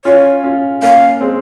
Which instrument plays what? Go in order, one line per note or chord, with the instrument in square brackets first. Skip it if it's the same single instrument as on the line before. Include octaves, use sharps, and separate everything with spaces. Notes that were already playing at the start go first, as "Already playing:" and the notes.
[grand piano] C#4 F4 [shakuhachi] C#5
[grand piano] C#4 F4
[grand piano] A#3 C#4 [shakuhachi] F5
[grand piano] G#3 C4